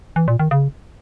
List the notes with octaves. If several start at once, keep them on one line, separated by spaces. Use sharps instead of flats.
E3
A#2
D#3
C#3